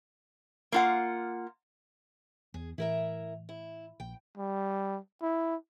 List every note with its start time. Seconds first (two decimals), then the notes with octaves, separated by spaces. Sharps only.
0.72 A#3 F4 F#5
2.54 E2 G#4
2.78 A2 E3 E4 A#4 E5
3.49 E4
4.00 A#1 G5
4.37 G3
5.22 E4